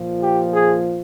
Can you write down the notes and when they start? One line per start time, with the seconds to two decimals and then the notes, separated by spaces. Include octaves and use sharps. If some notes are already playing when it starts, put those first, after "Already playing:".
Already playing: A#2 F3
0.20 G4
0.51 G#4